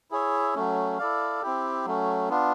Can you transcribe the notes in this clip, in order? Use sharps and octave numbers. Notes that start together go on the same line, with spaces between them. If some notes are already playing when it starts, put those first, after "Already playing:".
E4 G#4 C#5 E5
F#3 A3 C#4
E4 A4 D5 F5
C4 E4 G4
F#3 A3 C#4
B3 D4 F4